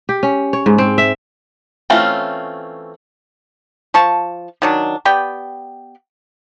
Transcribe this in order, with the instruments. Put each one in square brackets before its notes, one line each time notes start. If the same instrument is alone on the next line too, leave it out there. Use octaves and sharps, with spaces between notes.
[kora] G4
C#4
C#5
G#2
C4
E5
[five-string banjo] E3 A3 C4 C#4 F4
[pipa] F3 A5 C#6
D#3 F#3 D4
B3 G4 D5 G5